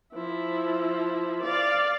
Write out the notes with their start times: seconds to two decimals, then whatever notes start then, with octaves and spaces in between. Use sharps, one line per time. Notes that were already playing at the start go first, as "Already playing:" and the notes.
0.13 F3 E4
1.42 D5 F5